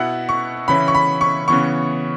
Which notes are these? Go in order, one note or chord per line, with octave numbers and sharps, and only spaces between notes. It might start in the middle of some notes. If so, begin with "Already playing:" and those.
Already playing: B2 B3 E4 F#5
C#6
C#3 E3 C#4 E4 B5
C#6
B5
C#6
C#3 E3 B3 C#6